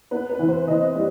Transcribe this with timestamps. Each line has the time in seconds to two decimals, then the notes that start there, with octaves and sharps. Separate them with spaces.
0.11 B3 B4
0.30 B4
0.39 E3
0.49 C5
0.67 E3 D#5
0.95 G3